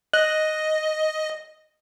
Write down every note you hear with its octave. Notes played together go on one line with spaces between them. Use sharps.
D#5 F#6